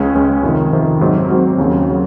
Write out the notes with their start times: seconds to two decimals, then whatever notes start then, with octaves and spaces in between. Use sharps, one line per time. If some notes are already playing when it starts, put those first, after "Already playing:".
Already playing: C#2 G#3 C#4
0.15 C#2 C#3 G#3 C#4
0.43 F2 C3 D#3
0.73 F2 C3 D#3
1.01 G#2 F#3 C4
1.30 G#2 F#3 C4
1.58 D#2 C#3 F#3
1.90 C#3 F#3